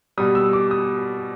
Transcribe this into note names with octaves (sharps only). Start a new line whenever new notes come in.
B2 G3 D#6
E6
D6
D#6